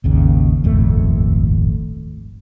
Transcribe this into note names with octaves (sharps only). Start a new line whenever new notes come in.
G#1 D#2 C#3
D#1 G#1 F2 A3